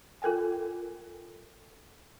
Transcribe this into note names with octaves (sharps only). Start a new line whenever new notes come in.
F4 A4 A#4 G5 G#5